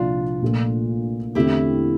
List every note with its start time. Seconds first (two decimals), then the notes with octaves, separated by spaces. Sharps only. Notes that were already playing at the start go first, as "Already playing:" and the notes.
Already playing: C2 A#2 F3 D4 F4
0.42 A#1 A#2 A3
1.35 E2 D3 A3 C4 E4 G4